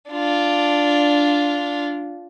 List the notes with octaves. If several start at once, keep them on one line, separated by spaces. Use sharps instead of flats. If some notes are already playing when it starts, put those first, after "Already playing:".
D4 F4